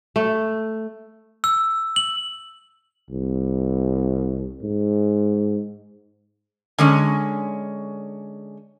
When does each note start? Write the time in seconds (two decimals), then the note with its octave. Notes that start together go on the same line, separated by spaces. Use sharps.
0.16 A3
1.44 E6
1.96 F#7
3.10 C2
4.63 G#2
6.78 D3 G#3 C#4